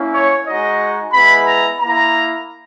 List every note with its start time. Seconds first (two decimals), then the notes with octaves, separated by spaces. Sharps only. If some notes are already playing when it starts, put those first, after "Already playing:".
Already playing: A#3 C#4 E4
0.14 C#5
0.47 G#3 D#4 F#4 D#5
1.13 G#3 B3 E4 B5
1.47 A#5
1.80 A#3 E4 A#5